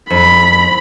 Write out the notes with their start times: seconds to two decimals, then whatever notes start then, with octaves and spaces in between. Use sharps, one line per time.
0.10 F2 B5